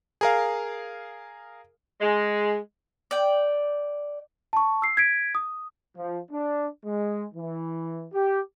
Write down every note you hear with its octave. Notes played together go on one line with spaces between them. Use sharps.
G#4 A#4 F5
G#3
D5 G5
A5 C#6
E6 C7
G#6 B6 D7
D#6
F3
D4
G#3
E3
G4